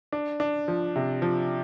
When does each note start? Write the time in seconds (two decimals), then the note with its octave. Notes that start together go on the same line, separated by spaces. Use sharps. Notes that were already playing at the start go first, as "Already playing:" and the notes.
0.12 D4
0.40 D4
0.68 F3
0.96 C3
1.22 F3